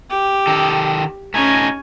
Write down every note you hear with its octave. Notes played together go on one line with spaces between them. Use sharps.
G4
D#3 A4
A3 C#4 D#4 G#5